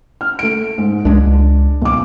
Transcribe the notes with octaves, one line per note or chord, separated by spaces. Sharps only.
F6
A3 D7
G#2
C#2 G#3 D4
B1 D6